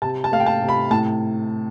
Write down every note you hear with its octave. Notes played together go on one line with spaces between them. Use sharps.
C3 A5
A5
A3 F5
G5
A5
C3
B5
A2 A5